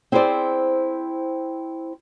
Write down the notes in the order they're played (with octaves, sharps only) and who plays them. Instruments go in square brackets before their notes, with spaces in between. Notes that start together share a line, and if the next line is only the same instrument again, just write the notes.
[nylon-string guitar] C4 E4 G#4 B4 C5 D5